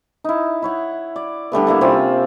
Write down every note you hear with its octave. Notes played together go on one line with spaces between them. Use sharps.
D#4 E4
E4 C#5 F#5
D5
D3 G3 A3 B3
G3 A#3 E4
C3 C4 C#4 F4